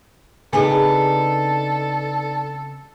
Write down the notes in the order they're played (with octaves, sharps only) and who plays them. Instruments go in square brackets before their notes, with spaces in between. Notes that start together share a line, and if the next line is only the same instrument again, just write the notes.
[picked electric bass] C#3 C4 [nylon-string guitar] B3 D4 D#4 [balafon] G#4 G#5 [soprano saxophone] A4